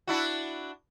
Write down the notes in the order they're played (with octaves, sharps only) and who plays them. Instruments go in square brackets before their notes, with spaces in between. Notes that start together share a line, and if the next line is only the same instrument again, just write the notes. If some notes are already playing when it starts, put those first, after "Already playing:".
[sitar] D4 E4 F#4